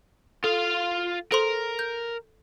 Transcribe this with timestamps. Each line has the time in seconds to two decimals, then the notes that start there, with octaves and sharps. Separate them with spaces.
0.44 F4 A4 F5
1.32 A4 A#4 C5 C6
1.79 G6